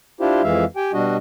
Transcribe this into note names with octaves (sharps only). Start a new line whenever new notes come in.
D4 E4 F4 G4 C5
F2 E3 G#3 E5 F5
G4 G5 G#5
B2 G3 D4 F#4 D#5